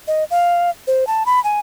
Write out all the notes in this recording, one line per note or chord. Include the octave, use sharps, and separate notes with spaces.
D#5
F5
C5
A5
B5
G#5